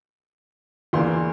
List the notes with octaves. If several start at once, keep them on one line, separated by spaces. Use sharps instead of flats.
E2 E3 A#3 D4 C6